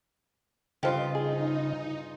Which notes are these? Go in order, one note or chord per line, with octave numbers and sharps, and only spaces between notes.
G2 C#3 F4 G4 A4 C5 D#5
D#4 G#4